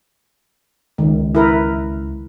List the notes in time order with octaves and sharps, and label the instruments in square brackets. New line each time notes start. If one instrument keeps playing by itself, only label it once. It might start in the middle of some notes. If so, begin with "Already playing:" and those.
[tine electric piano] C#2 [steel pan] D#3
[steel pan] E4 A#4 B4